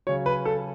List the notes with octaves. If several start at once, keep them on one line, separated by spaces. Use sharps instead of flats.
C#3 F#3 C#5
B4
A4